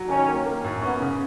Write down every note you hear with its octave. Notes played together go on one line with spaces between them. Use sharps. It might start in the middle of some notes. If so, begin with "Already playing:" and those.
Already playing: F#3
D#3 C#4
A#3
A#3
F#2
B3 C#4
C#3